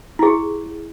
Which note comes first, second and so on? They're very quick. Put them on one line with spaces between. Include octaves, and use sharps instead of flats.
E4 G#4 G4